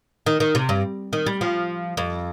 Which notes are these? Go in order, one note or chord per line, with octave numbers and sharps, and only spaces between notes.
D#3
D#3
C3
G2
D#3
G3
F3
F2